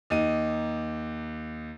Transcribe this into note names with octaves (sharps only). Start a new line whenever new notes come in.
D#2 D#4 D#7